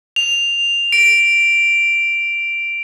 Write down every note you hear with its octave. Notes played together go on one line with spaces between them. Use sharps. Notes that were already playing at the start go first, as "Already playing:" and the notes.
F7
D7